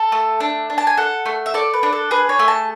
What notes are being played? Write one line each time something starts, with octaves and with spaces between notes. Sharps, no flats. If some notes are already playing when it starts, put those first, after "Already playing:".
Already playing: A4
A3
D4
D4
A5
G#5
A4 F#5
A3
E5
A4 D5
B4
D4
A4
G#4 B4
C#5
A3
A5